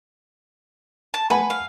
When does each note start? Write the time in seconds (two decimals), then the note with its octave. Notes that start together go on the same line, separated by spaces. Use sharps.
1.14 A5
1.30 B4 F#5 G#5 B5
1.50 F5